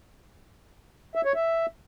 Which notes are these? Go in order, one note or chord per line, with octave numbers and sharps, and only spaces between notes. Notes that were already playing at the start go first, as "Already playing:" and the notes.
E5
C#5
E5